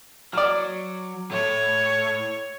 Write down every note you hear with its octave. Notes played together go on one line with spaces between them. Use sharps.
F#3 D5 F6
A2 A3 C#5